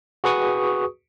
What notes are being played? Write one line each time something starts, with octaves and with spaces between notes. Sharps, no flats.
F#4 G#4 B4 C#6 D#6